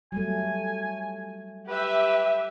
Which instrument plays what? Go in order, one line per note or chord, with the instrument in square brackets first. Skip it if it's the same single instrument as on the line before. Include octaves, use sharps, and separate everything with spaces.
[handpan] F#3 G3 A3 [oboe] G#5
[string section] G4 E5 [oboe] B4